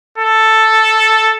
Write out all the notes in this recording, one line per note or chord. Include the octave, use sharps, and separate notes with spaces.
A4